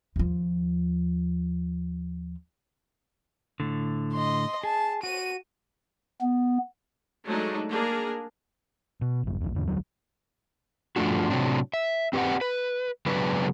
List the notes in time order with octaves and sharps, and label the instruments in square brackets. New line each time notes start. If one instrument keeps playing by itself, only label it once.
[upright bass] D#2 F3
[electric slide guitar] A2 D3
[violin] D#5 C6
[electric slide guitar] G#4 [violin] A5
[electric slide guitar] F#4 [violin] D#7
[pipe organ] B3
[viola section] F#3 G#3 A3 D4 D#4
A#3 D4 G#4 A#4
[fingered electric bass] B2
G#1 F#2
A#1 E2
E2 G#2 D3
E1 D2 F#3
[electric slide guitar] G2 F3 A3 D4 F#4
A2 C3 F#3 G3 C4 D4
E5
C4 G4 B4 D5 F#5
B4
C#3 F#3 G#3 B3 D4 B4